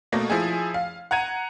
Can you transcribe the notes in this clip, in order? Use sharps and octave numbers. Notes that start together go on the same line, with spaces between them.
B2 A3 A#3
F3 E4 G#4
F5
F#5 A#5 G#6 D#7